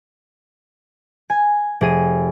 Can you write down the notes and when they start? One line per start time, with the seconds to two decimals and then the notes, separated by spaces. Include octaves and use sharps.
1.30 G#5
1.81 F1 G#4 D#7